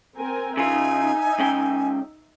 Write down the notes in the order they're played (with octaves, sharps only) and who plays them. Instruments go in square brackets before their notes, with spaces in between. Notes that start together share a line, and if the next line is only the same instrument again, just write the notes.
[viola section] C4 A#4 G#5
[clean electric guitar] C#3 F4 [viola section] D#4 E5 [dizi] G#5
[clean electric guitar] C#2 C#4 G5